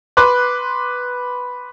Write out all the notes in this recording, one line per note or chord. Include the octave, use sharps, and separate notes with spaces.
B4 C6 D6 F#6